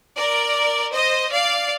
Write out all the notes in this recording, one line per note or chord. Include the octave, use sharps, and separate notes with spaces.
A#4 D5
C5 D#5
D5 F5